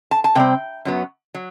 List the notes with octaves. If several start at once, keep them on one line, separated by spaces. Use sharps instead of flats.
A5
A5
C3 G3 C4 G5
F#2 F#3 B3
F#3